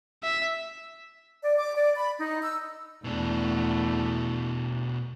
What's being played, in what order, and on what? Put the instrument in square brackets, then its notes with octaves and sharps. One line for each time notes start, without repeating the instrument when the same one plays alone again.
[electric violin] E5
[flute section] D5
D6
D5
B5
D#4
E6
[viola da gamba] E2 A3 [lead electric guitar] B2 D4